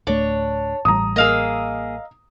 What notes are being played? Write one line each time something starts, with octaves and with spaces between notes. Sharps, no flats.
D1 A3 D4 C#5
A1 G3 A#5 D#6
A#3 G#4 D#5 F5 E6